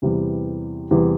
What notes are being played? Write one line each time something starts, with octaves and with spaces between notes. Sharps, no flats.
E2 C3 E3 G3
E2 C3 E3 G3